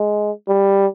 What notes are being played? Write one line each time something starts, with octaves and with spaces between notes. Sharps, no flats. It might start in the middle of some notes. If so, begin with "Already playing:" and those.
Already playing: G#3
G3